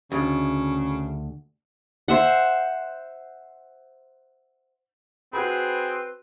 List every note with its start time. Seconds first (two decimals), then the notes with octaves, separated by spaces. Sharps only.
0.12 D2 C#3
2.08 C5 E5 F#5
5.33 C4 F#4 G#4 B4 B5